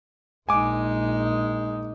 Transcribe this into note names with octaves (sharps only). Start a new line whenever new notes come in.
A#1 G#3 D#4 G#5 D6